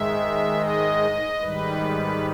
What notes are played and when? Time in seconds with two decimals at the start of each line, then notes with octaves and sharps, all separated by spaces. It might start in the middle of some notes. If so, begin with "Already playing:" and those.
Already playing: G#2 D#3 G#3 E5
0.57 D#5
1.40 G#2 D#3 G3 B4